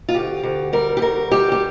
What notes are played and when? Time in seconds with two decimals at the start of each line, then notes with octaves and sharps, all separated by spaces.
0.09 F4
0.14 D2 G4
0.43 D2
0.73 G3 A#4
0.97 G4
1.02 D2 A#4
1.31 G3 G4
1.52 G4